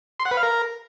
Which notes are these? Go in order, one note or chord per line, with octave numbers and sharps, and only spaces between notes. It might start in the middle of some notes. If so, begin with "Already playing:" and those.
C6
F#5
B4
F5
A#4